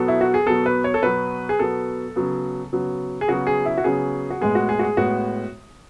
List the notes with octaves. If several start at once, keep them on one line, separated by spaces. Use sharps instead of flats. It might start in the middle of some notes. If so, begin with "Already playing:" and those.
Already playing: B2 F#3 B3 A4
E4
F#4
G#4
B2 F#3 B3 A4
B4
C#5
A4
B2 F#3 B3 B4
G#4
B2 F#3 B3 A4
C#3 F#3 B3
C#3 F#3 B3
G#4
C#3 F#3 B3 F#4
G#4
E4
F#4
C#3 F#3 B3 G#4
F#4
A2 G#3 B3 G#4
F#4
G#4
F#4
G#4
A2 G#3 B3 F#4